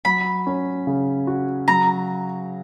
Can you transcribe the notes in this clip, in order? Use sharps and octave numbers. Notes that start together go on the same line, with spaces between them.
F#3 B5
C#4
C#3
F#4
F#3 A#5